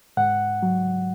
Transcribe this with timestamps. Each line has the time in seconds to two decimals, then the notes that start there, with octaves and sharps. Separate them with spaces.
0.17 G#2 F#5
0.63 F#3